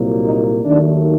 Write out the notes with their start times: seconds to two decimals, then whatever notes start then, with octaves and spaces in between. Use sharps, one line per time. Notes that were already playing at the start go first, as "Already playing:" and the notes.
Already playing: C2 A#2 F#3 A#3
0.24 D#4
0.64 D#2 D#3 F#3 A3 D4